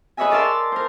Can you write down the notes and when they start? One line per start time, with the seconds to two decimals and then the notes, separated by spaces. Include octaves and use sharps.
0.17 G#4 B4 C#5 D#5 E5 G#5
0.31 A#4 D5 E5 F5 A5 C6
0.72 A#4 C5